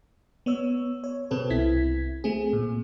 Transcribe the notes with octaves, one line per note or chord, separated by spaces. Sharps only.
B3 C#5 E6
C#5
B2 C4 A4 B4
C2 E4 G#6 B6
A3 C4 G#4
A#2